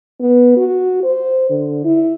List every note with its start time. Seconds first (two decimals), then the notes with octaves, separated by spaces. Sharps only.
0.20 B3
0.57 F#4
1.04 C5
1.50 D3
1.85 E4